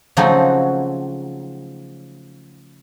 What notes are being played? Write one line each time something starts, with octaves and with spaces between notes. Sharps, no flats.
C#3 F3 F#3 A3 C4 D#4